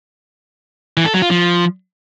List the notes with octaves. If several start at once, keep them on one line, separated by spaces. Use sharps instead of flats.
E3
A4
F#3
F4
F3